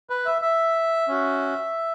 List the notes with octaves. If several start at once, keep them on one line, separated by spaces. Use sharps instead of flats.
B4
E5
E5
C#4 F#4